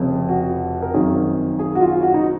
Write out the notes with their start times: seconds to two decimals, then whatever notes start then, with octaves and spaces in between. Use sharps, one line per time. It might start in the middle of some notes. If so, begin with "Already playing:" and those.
Already playing: F1 F2 C#3
0.29 F#4
0.82 A#4
0.94 G#1 F#2 D#3 G#4
1.59 G#4
1.75 F#4
1.81 F4
2.03 F#4
2.14 D#4